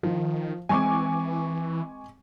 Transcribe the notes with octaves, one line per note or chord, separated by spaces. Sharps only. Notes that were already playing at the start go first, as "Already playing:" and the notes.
D#3 F3
E3 G#3 C4 G#5 C#6 D6